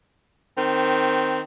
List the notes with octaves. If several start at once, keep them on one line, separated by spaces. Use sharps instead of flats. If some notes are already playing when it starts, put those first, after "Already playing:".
D#3 C4